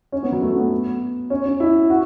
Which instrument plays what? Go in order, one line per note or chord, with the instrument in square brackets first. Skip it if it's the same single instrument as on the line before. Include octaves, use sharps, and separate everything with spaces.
[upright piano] C#4
B3
F#3
A3
B3
C#4
C#4
E4
F#4